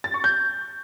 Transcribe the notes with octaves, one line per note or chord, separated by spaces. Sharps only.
A6
C#6
G6